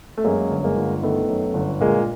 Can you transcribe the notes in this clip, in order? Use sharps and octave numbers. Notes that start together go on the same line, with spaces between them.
A3
F#2 G#3 A#3
G1
G#3 A#3
G1
D#3 A3 B3
F#2
G1
A#2 G#3 A#3